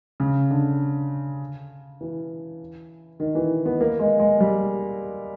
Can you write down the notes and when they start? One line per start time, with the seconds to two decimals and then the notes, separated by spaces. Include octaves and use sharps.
0.20 C#3
0.51 D3
2.01 E3
3.20 D#3
3.35 E3
3.66 B3
3.81 A#3
3.99 G#3
4.19 G#3
4.40 G3